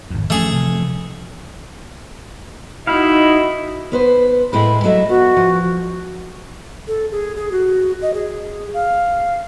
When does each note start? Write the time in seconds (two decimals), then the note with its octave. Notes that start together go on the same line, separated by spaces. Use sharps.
0.10 G#1 F2
0.30 E3 F3 A3 C#4 G#4
0.53 C3 F3
2.87 D#4 E4 F#4 D#5 F5
3.92 B3 B4 C5
4.53 A2 G#3 E4 B5
4.84 F#3 A3 D#5 E5
5.09 B3 F#4
5.37 F3
6.87 A4
7.12 G#4
7.36 G#4
7.52 F#4
8.02 D#5
8.14 G#4
8.74 F5